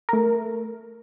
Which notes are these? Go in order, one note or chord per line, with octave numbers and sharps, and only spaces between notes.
A3 A#4